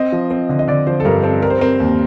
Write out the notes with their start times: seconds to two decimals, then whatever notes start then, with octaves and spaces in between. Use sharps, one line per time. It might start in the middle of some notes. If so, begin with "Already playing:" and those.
Already playing: C4 D#5
0.12 F3
0.31 C4
0.49 D3
0.59 D#5
0.68 D3 D5
0.87 F3 C5
1.00 A4
1.05 G2 A#4
1.23 C4 A4
1.42 G3 A#4
1.50 C5
1.59 C4 A#4
1.80 D#2